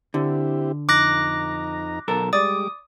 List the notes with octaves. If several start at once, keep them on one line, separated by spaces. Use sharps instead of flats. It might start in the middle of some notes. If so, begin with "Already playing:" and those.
D3 C4 E4 G4
F2 D#4 A#5 D6 F#6 A#6
B1 A4 A#4
G3 G#3 D5 D6 D#6